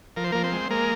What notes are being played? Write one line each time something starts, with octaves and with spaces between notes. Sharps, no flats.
F3 A#4
C5
F3 A#3 A#4
C4 C5
G#3
G#3 A#3 A#4